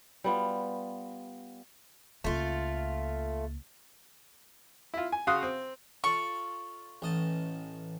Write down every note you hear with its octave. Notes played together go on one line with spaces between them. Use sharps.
G3 B3 F4
C#2 A3 A#3 F4
E4 F4
G#5
C#3 F#4 F5 C6 D#6 F#6
C4
F4 A4 D5 C#6
A1 D#5 A5